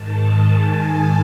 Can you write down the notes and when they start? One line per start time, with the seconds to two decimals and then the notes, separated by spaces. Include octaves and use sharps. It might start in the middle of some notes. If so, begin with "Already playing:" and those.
Already playing: G#2 D#3 A5
0.45 G#5